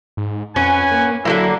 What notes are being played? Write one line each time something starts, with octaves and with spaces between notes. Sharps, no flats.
G#2
F2 C#4 B4 F#5 G#5
A#3
D3 D#3 F#3 A#3 E4